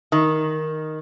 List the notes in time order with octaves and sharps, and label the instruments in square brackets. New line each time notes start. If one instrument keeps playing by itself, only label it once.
[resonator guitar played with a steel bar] D#3